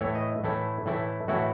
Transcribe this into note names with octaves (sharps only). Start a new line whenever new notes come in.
A2 E3 A3 E4 C#5
D#5
A2 E3 A3 E4
A2 E3 A3 E4
A2 E3 A3 E4 F#4